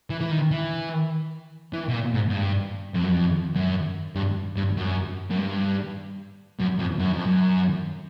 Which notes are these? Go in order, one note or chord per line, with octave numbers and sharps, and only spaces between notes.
E3
E3
D#3
E3
E3
B2
A#2
G#2
G#2
G2
F2
F#2
F2
F#2
G2
G2
F#2
F#2
G2
F#2
F2
F#2
F2
F#2